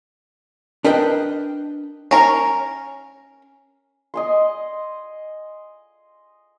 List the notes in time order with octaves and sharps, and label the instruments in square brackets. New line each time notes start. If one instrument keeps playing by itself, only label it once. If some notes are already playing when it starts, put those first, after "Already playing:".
[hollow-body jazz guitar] D4 A#4 B4 D#5 G5
[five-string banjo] C#4 A#4 C#5
[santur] D#5 G#5 C6